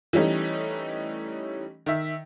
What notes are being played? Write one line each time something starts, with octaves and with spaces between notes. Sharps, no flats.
E3 G3 A3 C#4 D#4
D#3 E5